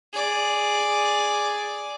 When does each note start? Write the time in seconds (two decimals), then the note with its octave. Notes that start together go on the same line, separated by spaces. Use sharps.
0.13 G#4 D5